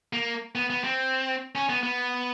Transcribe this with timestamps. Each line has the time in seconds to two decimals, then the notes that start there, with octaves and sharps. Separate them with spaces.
0.13 A#3
0.55 B3
0.70 B3
0.84 C4
1.55 C#4
1.69 B3
1.83 B3